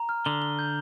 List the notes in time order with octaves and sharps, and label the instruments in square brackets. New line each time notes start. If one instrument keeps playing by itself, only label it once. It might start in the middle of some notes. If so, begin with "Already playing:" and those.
Already playing: [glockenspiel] A#5
F6
[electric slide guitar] D3 [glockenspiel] G7
[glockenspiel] G7
G6